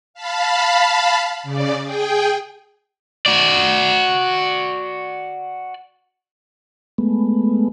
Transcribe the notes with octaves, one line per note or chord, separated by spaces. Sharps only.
F5 A5 B5
C#3 D5
G#4 G5
F#4 D5
G#3 A3 B3